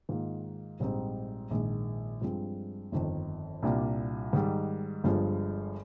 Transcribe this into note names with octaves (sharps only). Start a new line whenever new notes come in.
G#2 D#3 A#3 F4
A#1 G#2 G3 C4 D#4
A#1 G#2 D#3 G#3
G2 F3 G#3 C4
G1 F2 D#3
C2 A#2 G3 A#3 D4
G#2 D#3 G3
G1 G2 F3 G#3